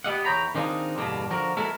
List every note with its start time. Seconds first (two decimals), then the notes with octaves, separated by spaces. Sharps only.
0.04 B3 G4 D#5 F#5
0.25 E2 C#5 G5 A#5 B5
0.55 D#3 C4 D4 D#4 F4 G#4
0.98 E2 G2 B2 D3 A#3 D4
1.31 D3 F3 F#4 A#4
1.57 G#3 B3 E4 F#4 A4 A#4